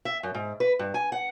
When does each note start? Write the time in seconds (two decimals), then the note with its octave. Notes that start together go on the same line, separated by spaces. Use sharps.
0.05 E5
0.23 F#2
0.34 G#2
0.60 B4
0.79 G2
0.94 G#5
1.12 F#5